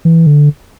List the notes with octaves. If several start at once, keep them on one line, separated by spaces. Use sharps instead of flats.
E3
D3